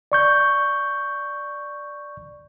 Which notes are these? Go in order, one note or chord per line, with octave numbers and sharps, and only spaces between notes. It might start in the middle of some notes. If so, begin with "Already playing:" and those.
D5 C#6 G6